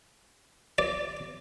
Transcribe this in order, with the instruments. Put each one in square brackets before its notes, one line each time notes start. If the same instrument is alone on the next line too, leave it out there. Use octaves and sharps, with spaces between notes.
[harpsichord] D5